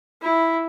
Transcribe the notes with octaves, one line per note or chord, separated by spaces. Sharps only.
E4